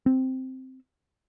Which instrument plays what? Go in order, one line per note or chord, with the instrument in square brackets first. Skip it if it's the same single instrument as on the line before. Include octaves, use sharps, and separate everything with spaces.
[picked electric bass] C4